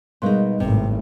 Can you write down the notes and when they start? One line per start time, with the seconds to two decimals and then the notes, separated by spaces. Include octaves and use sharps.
0.22 B2 G3 G#3 D#4 A#4 C6
0.60 G#1 A2 C3